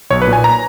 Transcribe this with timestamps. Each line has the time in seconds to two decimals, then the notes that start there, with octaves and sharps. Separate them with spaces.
0.10 B1 C#5
0.22 B4
0.27 A#2
0.33 G#5
0.44 A#5